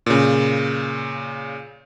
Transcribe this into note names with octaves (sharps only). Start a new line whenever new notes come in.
A#2 C#3